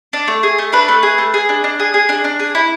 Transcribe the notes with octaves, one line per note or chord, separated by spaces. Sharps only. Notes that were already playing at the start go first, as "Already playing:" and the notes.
D4
A3
G#4
A3
D4 B4
A3
G#4
A3
G#4
D4
D4
G#4
G#4
D4
D4
G#4
E4